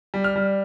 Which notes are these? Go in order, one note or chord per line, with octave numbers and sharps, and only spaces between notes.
G3
F6
G3